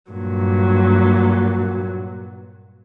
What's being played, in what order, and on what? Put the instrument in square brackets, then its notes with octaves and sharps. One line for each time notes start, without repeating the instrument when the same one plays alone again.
[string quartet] G2 A#2 F#3